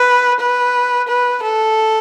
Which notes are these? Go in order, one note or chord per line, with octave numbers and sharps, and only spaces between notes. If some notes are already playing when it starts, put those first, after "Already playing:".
Already playing: B4
B4
B4
A4